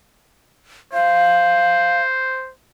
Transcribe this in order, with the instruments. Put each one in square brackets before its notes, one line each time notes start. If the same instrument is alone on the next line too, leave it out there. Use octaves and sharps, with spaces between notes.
[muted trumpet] C5 [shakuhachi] F5